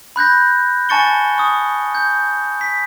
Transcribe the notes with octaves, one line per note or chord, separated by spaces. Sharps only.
B5 F#6 G6 A#6
G#5 A5 C#6 A6 C#7 G7
C#6 D#6
G6
B6